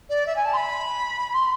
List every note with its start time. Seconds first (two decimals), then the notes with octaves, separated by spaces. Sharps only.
0.09 D5
0.26 E5
0.36 G#5
0.45 A5
0.53 C6
0.57 B5
1.34 C6